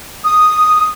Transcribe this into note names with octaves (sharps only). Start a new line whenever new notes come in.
D#6